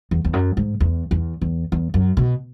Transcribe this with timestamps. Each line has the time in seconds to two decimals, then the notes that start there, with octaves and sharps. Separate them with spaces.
0.11 E2
0.25 E2
0.33 F#2
0.57 G#2
0.80 E2
1.11 E2
1.42 E2
1.72 E2
1.94 F#2
2.17 B2